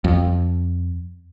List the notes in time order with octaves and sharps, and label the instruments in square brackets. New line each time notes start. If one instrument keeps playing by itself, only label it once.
[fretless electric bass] F2